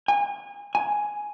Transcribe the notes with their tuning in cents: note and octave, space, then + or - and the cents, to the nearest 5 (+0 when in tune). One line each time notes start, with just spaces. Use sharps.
G#5 -30
G#5 +5